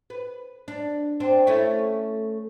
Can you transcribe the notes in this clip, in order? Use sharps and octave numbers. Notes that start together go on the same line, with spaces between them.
B4
D4
C4 D4
A3 C#4 E4